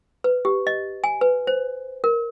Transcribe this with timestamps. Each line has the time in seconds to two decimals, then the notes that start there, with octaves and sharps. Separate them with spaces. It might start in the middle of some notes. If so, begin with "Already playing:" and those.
0.24 B4
0.45 G4
0.67 D#5
1.04 G#5
1.21 B4
1.47 C5
2.04 A#4